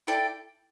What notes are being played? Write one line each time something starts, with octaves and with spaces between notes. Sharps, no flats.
E4 A4 D5 G5